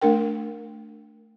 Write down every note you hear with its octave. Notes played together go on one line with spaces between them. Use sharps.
A3 D4 A#4 G5